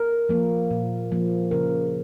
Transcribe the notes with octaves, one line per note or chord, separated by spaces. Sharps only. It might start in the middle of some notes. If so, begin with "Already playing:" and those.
Already playing: A#4
F3 A#3
A#2
F3 A#3
C#3 A#4